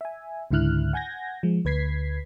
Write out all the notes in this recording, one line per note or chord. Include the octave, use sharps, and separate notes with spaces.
E5 G#5
C#2 G#2 D3 E4 F6 F#6
F#5 G#5 G6 G#6 A#6
F3 G#3
D2 B4 G#6 B6 C7